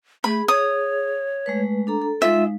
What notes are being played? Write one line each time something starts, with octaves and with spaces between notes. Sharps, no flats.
A3 G#4 B5
C#5 D#6
G#3 A3 B4
D4 A4 A#5
A4
G#3 D#4 F4 E5 F5